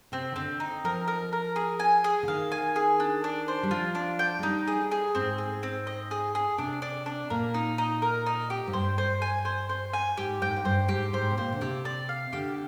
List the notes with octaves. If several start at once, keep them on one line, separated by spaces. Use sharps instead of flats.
C3 C4
D#3
D3 C4
D#4
F3 A#4
A#4
A#4
G#4
G#5
G#4
D3
D#3 F5
G#5
G#4
D4
D4
C5
G3
F3 F4
D4
G5
G#3
G3 D#4
G#4
G#4
G#2 C4
G#4
C4
D#5
G#4
G#4
C3 D4
D4
D4
A#2 A#4
D#4
D#4
A#4
D#4
G4
G#2
G2 C5
C5
G#5
C5
C5
G#5
G#2 G4
G#2 G5
G#2
G2 C5
G#2 G4
G#2 C5
C3
A#2 C5
D3
C3 G4
D5
F5
D3 G4